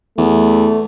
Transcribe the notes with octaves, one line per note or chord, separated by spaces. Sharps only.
E2 A3